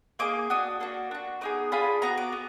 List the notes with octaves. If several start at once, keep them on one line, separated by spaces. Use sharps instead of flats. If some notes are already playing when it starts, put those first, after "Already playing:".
A#3 D#4 G#4 D6
D4 F#4 D#6
A#3 D4 F#4
D4 F#4
B3 D#4 G#4 D6
D4 F4 G#4 B5
B3 D#4 F#4 A#5
D6
B3